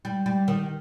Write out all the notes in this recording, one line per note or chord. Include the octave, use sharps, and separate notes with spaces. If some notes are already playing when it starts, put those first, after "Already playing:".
G3
G3
D#3